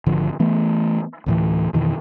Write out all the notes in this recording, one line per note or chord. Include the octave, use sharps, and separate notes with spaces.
G#1 D3 F3
E3 A3 B3
D2 A2 E3
F2 B2 D#3 E3